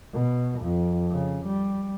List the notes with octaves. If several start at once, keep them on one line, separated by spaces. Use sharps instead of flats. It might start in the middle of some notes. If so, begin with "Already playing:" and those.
B2
F2
C#3
G3